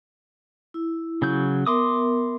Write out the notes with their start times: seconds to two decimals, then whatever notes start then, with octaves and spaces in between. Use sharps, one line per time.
0.74 E4
1.22 C#3 F#3 G6
1.66 B3 A#4 E5 C6 D6 D#6